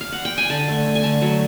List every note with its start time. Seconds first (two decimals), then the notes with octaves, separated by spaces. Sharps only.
0.01 F5
0.12 F#5
0.25 G5
0.38 G#5
0.50 D3 A5
0.68 A3
0.86 A3
0.95 G#5
1.03 D3 A5
1.22 F#3